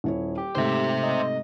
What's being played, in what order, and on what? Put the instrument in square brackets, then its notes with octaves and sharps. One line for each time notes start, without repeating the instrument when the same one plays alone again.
[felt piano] D#1 E4 C#5
[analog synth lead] G4
[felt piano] G#2 C3 A3 [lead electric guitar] C5 E5
[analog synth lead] D#5